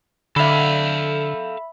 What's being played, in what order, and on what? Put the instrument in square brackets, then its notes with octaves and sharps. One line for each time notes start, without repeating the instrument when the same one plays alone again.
[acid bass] D3 [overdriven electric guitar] A4 F5 [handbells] E5 B5